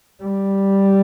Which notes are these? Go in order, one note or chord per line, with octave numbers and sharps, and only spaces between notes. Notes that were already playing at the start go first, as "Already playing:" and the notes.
G3